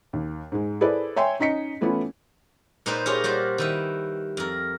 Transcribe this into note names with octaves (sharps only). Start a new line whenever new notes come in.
D#2
G#2 G#3
E4 G#4 A4 B4 C5 D5
C#5 E5 G5 G#5 C6
C#4 D#4 D#5 B6 C#7
E3 A3 B3 C#4 E4 F4
A#2 D#4 B4 C5 G5
F4 G4 G#4 A#4 C#5
G3 F#4 C5 D5
D#3 E4 B4
F2 A#4